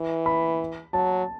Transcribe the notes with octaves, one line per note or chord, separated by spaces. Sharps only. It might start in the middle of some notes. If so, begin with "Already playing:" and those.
Already playing: E3
B5
F#3 A5